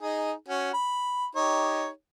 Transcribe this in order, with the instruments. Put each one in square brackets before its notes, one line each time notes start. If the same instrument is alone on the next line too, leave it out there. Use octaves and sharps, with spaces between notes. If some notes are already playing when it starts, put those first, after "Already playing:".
[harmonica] D#4 G#4
C#4 F#4
B5
D#4 G4 C#5